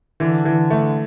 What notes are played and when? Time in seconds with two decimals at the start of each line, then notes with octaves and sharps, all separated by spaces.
0.20 D3 E3
0.45 E3
0.70 A3